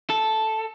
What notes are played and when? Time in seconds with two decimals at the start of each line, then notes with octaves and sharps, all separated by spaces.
0.10 A4